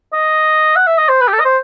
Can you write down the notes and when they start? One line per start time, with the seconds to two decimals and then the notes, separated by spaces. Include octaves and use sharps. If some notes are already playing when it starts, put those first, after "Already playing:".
0.13 D#5
0.76 F#5
0.87 E5
0.98 D#5
1.09 C5
1.21 B4
1.28 G4
1.33 A4
1.40 D#5
1.45 C5